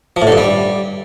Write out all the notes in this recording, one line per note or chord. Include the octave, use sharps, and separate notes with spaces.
F3
A2
D3
G2
G3